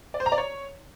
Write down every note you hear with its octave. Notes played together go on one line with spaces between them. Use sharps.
D5
C5
A#5
D5
C#5